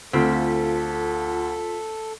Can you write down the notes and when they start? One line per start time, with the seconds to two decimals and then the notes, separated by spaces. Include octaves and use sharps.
0.13 D2 C4 F4 A4 B6